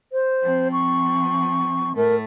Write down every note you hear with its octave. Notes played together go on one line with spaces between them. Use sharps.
C5
F3 C4
C#6
A2 A3 A#4